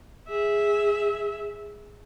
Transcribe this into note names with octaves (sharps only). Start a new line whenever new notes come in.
G#4 E5